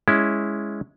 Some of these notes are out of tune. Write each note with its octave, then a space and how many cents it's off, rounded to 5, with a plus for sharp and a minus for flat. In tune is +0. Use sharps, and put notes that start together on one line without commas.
G#3 +0 C#4 +0 E4 +0